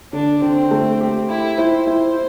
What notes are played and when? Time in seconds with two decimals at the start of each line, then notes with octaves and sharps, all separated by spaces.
0.13 D3 D4
0.42 D3 C4
0.71 A3
1.00 G4
1.28 E4 G4
1.58 E4 C5
1.87 E4